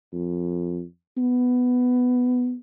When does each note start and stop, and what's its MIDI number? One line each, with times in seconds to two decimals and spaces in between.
0.13 0.83 41
1.17 2.55 59